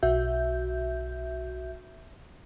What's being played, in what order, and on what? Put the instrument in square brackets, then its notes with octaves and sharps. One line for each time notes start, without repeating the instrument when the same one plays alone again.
[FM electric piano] B1 F#4 E5 G6